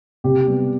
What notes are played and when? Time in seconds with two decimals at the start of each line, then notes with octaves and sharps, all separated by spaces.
0.24 C3 G4
0.47 G3 B3